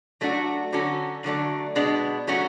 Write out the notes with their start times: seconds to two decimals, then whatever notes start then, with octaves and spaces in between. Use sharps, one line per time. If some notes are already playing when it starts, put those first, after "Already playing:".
0.21 F#3 A3 D4 F#4
0.73 D3 F#3 C#4 F#4 A4
1.24 D3 F#3 A3 D4
1.75 B2 G#3 B3 D4
2.27 F#3 A3 C#4 F#4